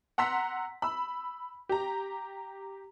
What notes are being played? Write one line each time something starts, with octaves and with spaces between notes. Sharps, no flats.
F#5 A#5 C6 E6 B6
B5 E6
G4 A#5